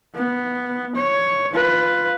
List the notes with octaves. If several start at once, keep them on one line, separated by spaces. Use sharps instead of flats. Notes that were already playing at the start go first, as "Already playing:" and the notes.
B3
C#5
F4 B4